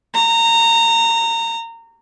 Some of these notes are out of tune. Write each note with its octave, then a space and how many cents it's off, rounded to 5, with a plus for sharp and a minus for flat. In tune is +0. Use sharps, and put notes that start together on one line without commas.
A#5 -25